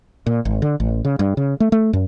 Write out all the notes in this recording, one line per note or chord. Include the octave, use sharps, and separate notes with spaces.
A#2
G#1
D3
A1
C#3
G2
C#3
A3
A3
F#2